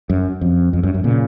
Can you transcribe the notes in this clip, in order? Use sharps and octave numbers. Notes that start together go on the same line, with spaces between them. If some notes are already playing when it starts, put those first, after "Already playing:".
F#2
F2
F2
F#2
F#2
A#2 C#3